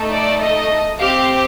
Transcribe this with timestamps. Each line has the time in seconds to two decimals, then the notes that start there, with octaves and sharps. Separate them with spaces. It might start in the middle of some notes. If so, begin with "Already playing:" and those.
Already playing: A3 D#4 A4
0.12 D5
0.41 D#5
1.00 C4 G4 F5